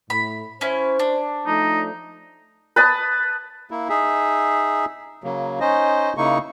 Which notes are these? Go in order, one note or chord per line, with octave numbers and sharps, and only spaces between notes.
A2 B5
C#4 E4 C5
D4
F3 A3 D#4
B4 A5 D#6
A#3 E4
D#4 G#4 E5
C#3 F#3 A#3
C#4 D#4 C5 D#5
C#3 A#3 D#4 E4 C#6